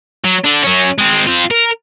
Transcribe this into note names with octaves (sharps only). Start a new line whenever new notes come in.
F#3
D3 D4
F#3 C#4
G#3 C4
C4 F4
A#4